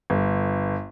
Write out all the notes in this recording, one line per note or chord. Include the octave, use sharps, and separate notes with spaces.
G1